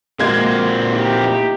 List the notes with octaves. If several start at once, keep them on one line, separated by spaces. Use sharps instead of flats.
A#2 G#3 A#3 C4 F4 F#4 G#6
D#4 E4 G4